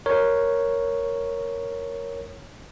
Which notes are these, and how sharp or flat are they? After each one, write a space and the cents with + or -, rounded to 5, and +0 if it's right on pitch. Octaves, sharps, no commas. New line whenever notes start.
A#4 +0 C#5 +0